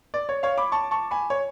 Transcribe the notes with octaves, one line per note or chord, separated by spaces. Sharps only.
D5
C#5
C#5 F5
B5 D6
A5 C#6
A5 C#6
G#5 B5
C#5